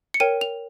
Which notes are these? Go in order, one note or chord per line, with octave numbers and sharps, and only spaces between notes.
C#7
A#4 C#5 G5 D#7
F7